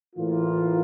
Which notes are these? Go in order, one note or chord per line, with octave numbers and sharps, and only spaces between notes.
A2 E3 A#3 F4